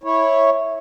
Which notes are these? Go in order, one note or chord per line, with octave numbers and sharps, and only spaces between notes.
E4 C#5